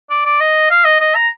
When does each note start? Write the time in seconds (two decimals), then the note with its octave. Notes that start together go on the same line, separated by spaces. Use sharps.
0.10 D5
0.25 D5
0.40 D#5
0.71 F5
0.85 D#5
1.01 D#5
1.15 A#5